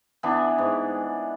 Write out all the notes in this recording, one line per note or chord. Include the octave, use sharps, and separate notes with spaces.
E3 B3 D4
G#2